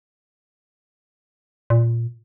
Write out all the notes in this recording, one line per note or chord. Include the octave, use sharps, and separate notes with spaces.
A#2